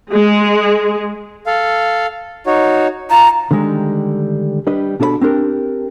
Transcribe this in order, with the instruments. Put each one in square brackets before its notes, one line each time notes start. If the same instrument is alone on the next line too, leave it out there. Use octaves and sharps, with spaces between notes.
[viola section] G#3
[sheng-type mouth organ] A4 F5
D#4 F#4 C#5
[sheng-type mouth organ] F4 A5 [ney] A#5
[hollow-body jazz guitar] D3 D#3 G3 G#3
G3 D4 B4 D#5
B2 D4 A4 D5 B5
C4 D4 G4 A#4